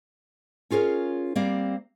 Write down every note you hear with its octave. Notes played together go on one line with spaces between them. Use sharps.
C#4 F4 G#4 A#4 C#5
G3 A#3 C4 D5